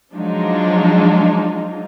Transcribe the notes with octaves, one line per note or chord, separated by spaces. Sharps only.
F3 F#3 G#3 D4 D#4 F4